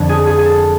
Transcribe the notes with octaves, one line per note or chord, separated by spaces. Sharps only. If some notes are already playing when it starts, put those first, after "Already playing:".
Already playing: F2 D3 F3 D4
G#4
G#4
G#4
A4